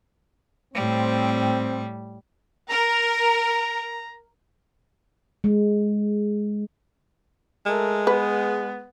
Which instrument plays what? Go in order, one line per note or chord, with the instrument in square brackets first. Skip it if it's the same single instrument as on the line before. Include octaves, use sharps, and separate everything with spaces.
[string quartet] A2 G3 [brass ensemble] C4
[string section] A#4 [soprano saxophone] A#5
[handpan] G#3
[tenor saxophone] G#3 [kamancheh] A3 A#4
[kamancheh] B3 [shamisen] B4